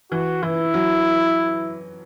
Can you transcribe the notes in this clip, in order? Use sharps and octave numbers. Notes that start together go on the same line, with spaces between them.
E3 F#4
E3 E4
F#3